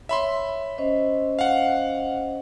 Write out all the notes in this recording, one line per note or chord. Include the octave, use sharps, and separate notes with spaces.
C#5 E5 B5 C6
C#4 C5 D#5
F5 F#5